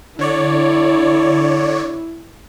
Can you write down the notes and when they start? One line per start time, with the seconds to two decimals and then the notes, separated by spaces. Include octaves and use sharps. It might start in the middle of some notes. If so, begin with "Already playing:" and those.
0.19 D3 E4 C#5 D5